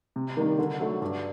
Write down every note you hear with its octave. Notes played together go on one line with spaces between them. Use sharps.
C3
D#3 G3 A#3 D#4
D3
F#3 A3
G2